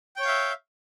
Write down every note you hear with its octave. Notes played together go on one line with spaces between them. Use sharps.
C#5 E5 F5 G5 G6